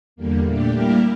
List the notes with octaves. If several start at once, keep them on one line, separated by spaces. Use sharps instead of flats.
E2 D3 G3 A#3
A#2 A3 D4 G4
G3 A#3 E4 G4 A#4